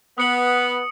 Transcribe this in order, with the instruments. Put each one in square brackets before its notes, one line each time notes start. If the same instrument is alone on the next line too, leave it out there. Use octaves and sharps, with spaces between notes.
[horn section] B3 [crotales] D#6 C#7 F#7